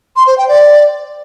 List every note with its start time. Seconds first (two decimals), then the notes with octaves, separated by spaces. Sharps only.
0.16 C6
0.27 C5
0.38 G5
0.49 D5